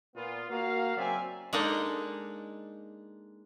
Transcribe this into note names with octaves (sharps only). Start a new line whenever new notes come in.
A#2 B3 F4
A#3 F#4 F5
C#3 F#3 C4 D5 E5 G#5
G#3 A#3 D4 D#4 A4 D5